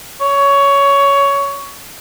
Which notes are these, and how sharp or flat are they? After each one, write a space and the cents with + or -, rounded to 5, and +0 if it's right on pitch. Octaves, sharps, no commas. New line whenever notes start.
C#5 +15